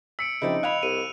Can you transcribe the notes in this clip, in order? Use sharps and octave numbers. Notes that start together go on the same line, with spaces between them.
E6 B6 C#7 D7
C#3 F3 C4 D#4 E4 D5 G5
D#5 F5 G#5 B5 F#6 F7
C2 D#7